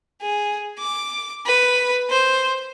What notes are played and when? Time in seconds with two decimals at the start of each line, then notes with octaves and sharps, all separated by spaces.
0.21 G#4
0.79 D6
1.46 B4
2.10 C5